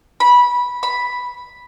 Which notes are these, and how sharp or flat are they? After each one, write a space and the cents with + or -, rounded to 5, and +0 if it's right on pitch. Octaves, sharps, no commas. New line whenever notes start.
B5 -15
B5 +0